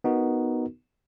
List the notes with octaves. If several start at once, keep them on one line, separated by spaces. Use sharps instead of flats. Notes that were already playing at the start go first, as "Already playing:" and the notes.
B3 D#4 F#4 A#4